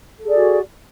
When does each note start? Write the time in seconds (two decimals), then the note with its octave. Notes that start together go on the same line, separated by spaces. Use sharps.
0.19 A4
0.24 G#4
0.29 D5
0.34 F#4